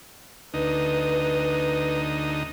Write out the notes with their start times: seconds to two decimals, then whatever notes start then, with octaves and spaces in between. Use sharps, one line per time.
0.54 D2 D#4 B4